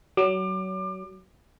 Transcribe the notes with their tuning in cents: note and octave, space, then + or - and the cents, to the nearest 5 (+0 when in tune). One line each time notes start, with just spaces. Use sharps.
F#3 +30 D6 +30